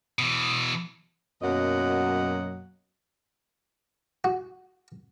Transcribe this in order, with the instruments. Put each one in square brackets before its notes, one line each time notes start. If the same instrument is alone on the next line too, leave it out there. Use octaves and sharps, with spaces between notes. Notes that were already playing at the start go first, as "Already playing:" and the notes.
[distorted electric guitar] B2 E3
[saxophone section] F#2 B2 F#3 A#3 D#5 F#5
[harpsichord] F#4